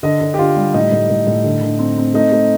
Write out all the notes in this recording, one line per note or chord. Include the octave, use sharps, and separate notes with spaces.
D3 D#5
D3
G4
D3 F4
G3
A2 D#4
A2
A2
A2
D3
D3
C4
C4
A3 D#4
A3